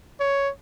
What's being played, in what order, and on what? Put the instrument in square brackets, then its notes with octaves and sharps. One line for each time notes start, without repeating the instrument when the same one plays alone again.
[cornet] C#5